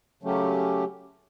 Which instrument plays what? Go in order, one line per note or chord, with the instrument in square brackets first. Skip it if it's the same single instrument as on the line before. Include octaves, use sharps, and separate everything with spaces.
[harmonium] C#3 F#3 A3 C#4 G4